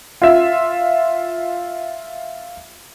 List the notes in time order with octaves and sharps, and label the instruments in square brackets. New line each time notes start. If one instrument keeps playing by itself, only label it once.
[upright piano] F4 E5